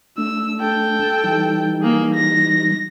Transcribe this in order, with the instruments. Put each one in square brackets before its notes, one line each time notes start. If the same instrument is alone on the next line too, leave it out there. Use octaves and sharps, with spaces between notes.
[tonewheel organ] A3 D4 [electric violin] E6
[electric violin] A4 G5
[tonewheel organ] E3 G3 D#4
[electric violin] A#3 G#4
A#6